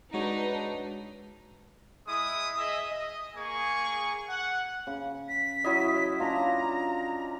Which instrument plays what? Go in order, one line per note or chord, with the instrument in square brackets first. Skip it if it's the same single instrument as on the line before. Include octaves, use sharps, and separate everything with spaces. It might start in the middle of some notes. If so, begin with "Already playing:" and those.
[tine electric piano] G#3 F#4 C#5 [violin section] D4 D#4 B4
[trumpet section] G#3 E4 D#6
G#4 D#5 E5
D#5
A#3 G#4 G#5 C#6
F#5
[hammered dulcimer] C#3
[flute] B6
[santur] F#3 E4 D#5
[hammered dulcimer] C#4 D4 F4 [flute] A#5